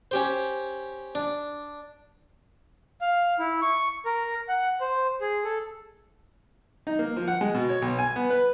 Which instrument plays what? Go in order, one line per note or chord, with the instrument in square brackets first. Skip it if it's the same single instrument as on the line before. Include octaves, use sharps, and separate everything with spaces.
[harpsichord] C#4 G4 C5
D4
[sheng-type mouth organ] F5
E4
C#6
A#4
F#5
C5
G#4
A4
[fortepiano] D#4
A#3
F3
F#5
G#3
B2
C#5
B1
G#5
B3
B4